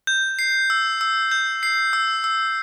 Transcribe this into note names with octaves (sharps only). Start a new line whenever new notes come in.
G6
C7
E6
E6
G6
C7
E6
E6